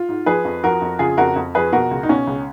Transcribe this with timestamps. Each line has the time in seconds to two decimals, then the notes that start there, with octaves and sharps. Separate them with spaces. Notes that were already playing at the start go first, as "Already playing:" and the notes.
Already playing: F4
0.09 G#2
0.26 F3 G#4 B4
0.45 F2
0.63 F3 F#4 A#4
0.82 F2
0.99 C#3 F4 G#4
1.17 F2 F#4 A#4
1.36 F2
1.55 F3 G#4 B4
1.73 B2 F#4 A#4
1.91 C#2
2.03 D#4
2.09 B2 C#4
2.27 C#2